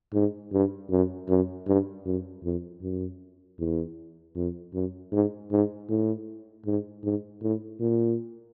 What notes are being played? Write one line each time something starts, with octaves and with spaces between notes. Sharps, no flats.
G#2
G2
F#2
F#2
G2
F#2
F2
F#2
E2
F2
F#2
G#2
G#2
A2
G#2
G#2
A2
A#2